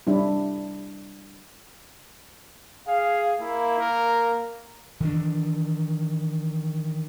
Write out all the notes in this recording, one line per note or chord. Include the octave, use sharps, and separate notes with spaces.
G3 D4 E4
G#4 F5
A#3 E4
A#4
D#3 E3 D4